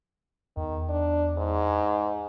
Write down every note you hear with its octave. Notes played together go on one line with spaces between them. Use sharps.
E2 D#3
D4
G#2